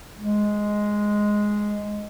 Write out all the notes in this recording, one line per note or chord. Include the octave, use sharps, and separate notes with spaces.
G#3